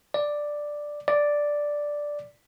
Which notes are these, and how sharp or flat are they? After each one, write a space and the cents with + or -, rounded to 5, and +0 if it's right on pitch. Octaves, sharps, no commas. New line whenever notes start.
D5 +5
D5 +0